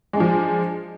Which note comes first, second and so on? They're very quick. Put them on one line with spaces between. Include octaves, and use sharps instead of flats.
G#3 D4 F3